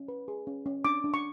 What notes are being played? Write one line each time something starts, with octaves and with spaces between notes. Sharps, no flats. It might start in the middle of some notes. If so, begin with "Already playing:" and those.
Already playing: C#4
B4
G#4
C#4
C#4
D4 D6
D4
C#6